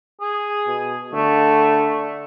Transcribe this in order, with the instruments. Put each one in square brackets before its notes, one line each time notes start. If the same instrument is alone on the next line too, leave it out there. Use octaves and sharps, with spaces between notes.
[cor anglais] G#4
[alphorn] B2
[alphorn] D3 [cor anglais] A3